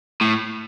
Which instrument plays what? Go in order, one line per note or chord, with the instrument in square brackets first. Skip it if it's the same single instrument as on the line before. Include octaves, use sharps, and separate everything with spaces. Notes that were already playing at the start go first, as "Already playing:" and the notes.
[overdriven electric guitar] A2